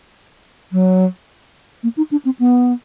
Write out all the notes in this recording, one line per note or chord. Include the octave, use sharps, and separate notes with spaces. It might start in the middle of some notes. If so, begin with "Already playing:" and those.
F#3
A#3
D#4
D4
C4
B3